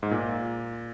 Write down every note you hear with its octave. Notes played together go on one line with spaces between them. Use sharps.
G#2
A#2